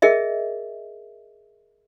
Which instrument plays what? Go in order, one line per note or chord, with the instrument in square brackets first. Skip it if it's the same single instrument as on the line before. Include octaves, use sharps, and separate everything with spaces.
[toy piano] G#4 A#4 D#5 E5